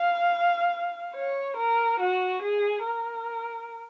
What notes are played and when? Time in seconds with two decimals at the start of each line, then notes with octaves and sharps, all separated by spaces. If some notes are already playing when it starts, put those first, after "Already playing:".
Already playing: F5
1.15 C#5
1.57 A#4
2.00 F#4
2.42 G#4
2.84 A#4